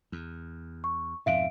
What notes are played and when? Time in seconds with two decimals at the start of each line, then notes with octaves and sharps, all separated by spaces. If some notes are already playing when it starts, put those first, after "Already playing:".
0.12 E2
0.84 C#6
1.26 F2 G#2 B2 E5 F5 D7